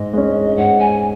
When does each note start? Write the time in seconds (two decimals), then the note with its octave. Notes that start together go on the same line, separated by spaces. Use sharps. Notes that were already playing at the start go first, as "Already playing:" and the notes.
Already playing: G#2 D#5
0.14 G#3 C#4
0.57 G#2 F#5
0.80 G#5